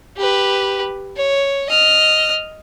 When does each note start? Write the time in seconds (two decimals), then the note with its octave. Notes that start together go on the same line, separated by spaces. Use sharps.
0.17 G4 B4
1.16 C#5
1.69 D#5 F6